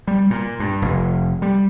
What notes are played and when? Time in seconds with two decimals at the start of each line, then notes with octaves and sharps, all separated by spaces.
0.07 G3
0.30 A#2
0.60 G2
0.82 F1
1.42 G3